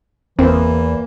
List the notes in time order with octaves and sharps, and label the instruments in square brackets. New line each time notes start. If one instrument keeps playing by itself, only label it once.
[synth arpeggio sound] G1 C4 [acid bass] E2 [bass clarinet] E3 [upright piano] A#3